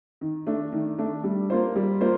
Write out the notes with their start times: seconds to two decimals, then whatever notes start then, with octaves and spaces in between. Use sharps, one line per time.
0.21 D#3
0.47 A3 D4
0.72 D#3
0.98 A3 D4
1.24 G3
1.50 A#3 F4 C5
1.76 G3
2.01 A#3 F4 C5